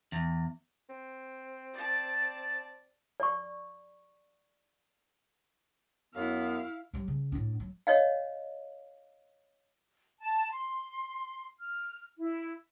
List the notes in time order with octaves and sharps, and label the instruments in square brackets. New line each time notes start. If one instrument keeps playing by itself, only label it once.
[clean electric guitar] E2
[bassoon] C4
[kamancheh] D5 A5
[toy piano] D5 C#6
[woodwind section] F#2 B3 [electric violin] E4 F5
[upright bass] F#3 G3
C#3
A2 D4
F#3
[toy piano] C#5 D#5 F5
[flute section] A5
C6
F6
E4